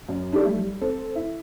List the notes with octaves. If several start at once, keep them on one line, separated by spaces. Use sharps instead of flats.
F#2
D4 D#4 G4 A4 D5
G3 A3
G3
C4 A4
E4